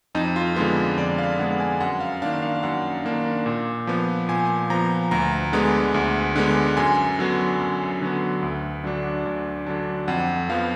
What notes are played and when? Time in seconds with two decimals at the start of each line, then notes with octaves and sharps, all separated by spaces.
0.15 F2 D#4
0.36 F4
0.56 D3 G#3 B3 F4
0.97 F2 D5
1.18 F5
1.39 D3 G#3 B3 F#5
1.60 G#5
1.80 F#2 F#5
2.00 F5
2.22 D#3 A#3 D4 F5
2.43 F5
2.63 F#2 F#5
3.04 D#3 A#3 D4
3.46 A#2
3.87 F3 B3
4.29 A#2 G#5
4.70 F3 B3 A#5
5.11 D2 A#5
5.53 D3 G#3 B3
5.94 D2
6.36 D3 G#3 B3
6.77 F#2 G#5
7.19 D3 F#3 B3
7.60 F#2
8.01 D3 F#3 B3
8.43 D2
8.84 D3 F#3 D4
9.26 D2
9.66 D3 F#3 D4
10.08 F2 F#5
10.49 F3 B3 F5